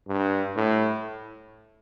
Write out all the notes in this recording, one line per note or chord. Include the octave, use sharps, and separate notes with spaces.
G2
A2